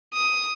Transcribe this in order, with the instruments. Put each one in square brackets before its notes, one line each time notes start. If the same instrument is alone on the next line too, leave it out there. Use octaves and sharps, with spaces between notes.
[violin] D#6